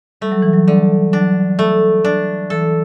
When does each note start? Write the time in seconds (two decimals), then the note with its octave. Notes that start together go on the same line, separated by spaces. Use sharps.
0.22 G3 A3
0.32 F#3
0.42 E3
0.53 F#3
0.67 D3 G3
1.13 F#3 D4
1.59 A3
2.05 D4
2.50 E3 A4